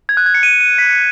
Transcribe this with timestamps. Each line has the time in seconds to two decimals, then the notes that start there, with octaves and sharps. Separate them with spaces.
0.09 G#6
0.17 F#6
0.26 G#6
0.34 C#7
0.43 D#7
0.60 D#7
0.78 B6
0.90 C#7